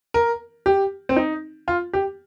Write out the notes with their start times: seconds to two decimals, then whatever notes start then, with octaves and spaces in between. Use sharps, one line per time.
0.14 A#4
0.66 G4
1.09 C4
1.16 D#4
1.68 F4
1.93 G4